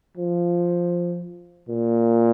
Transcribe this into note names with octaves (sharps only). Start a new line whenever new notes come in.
F3
A#2